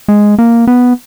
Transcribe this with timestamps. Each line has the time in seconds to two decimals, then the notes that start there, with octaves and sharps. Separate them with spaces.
0.08 G#3
0.38 A#3
0.67 B3